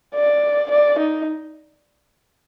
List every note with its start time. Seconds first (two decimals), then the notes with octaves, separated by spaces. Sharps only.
0.15 D5
0.71 D5
0.99 D#4